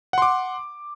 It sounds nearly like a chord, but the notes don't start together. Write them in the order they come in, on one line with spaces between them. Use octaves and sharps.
F#5 C6 D6